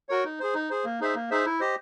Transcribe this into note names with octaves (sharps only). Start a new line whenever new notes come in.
F#4 A#4 C#5
D#4
G#4 C5
D#4
G#4 C5
A#3
D#4 G#4 C5 E5
A#3
D#4 G#4 C5 E5
E4
G4 C5 D#5